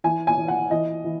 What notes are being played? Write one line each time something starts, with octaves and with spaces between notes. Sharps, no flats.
E3 G#5
G#5
E3
F#5
E3 D#5
E3